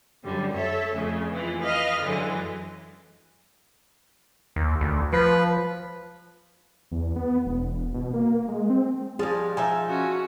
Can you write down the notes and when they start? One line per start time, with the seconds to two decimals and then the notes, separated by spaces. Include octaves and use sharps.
0.23 F#2 D3 G3
0.54 A4 C#5 E5
0.94 F2 C#3 A3
1.33 E3 F4
1.63 B4 D#5 F5 B5 F6
2.01 F#2 D3 E3 F#3 G#3
4.56 D#2
4.81 D2
5.13 F3 B4
6.91 E2
7.16 B3
7.45 E1
7.94 B2
8.14 A#3
8.48 G#3
8.70 C4
9.19 F3 G3 G#3 G#4
9.57 F3 D#4 E5 G#5
9.90 C#4 F#4